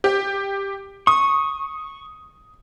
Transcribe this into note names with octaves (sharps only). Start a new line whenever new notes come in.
G4
C#6 D#6